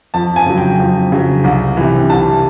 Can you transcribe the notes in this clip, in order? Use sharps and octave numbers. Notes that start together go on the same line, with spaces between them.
F2 A5
G#5
C#3 F#3
G5
F2
C#3 F#3
C2
C3 E3
C2 A5